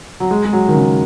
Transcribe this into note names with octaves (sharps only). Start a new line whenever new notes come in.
F#3
G#3
G#3
F#3
D#3
C#3